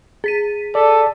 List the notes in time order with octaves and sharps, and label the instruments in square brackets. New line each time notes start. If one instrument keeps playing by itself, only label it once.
[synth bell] G#4 B6 D#7
[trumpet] A4 [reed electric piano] D5 [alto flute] A5